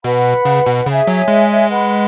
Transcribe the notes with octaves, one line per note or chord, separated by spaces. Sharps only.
B2 B4 F#5 B5
C#3
B2
C#3 G#4 C#5 E5 G#5
F#3
G#3
B4 F#5 B5